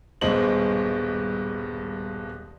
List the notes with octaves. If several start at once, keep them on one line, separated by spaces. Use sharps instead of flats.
D#1 G2 B2 G#3 C5 F#7